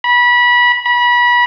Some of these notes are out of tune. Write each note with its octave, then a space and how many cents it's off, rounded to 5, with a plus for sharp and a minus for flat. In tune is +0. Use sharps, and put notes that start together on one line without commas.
B5 -25
B5 -30